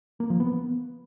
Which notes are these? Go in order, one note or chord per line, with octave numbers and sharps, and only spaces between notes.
A#3
F3
B3